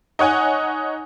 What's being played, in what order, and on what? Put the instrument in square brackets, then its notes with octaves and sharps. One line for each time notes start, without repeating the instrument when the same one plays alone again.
[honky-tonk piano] D#4 C#5 F#5 G#5